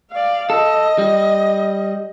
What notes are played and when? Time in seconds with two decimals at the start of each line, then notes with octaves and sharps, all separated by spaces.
0.11 D5 F5
0.50 A4 D#5
0.98 G3